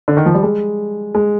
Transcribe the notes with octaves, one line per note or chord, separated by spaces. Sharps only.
D3
D#3
F3
G3
G#3
G#3